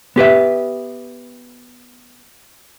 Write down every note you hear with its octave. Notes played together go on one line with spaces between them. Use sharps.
B3 G4 B4 E5